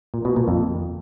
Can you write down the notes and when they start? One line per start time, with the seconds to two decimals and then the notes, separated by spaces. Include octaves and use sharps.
0.14 A#2
0.25 B2
0.36 A#2
0.48 F2